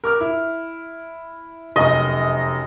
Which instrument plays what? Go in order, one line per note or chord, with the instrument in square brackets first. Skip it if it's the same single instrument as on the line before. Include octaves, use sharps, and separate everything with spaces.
[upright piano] A#4 D6 F6
E4
[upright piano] F1 F#2 [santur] D#5